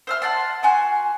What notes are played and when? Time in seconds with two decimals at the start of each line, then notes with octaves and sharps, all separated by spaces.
0.07 C5 E5 F6
0.22 F#5 G5 A5 C6
0.63 F#4 G#5 C6